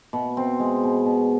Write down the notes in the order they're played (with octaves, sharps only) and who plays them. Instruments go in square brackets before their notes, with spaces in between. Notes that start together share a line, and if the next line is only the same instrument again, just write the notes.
[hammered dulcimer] B2
C4
G#3
B2
B2